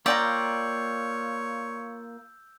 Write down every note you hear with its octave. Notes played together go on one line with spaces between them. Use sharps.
A#3 F4 C#5 D5 G5 A#5 E6 G6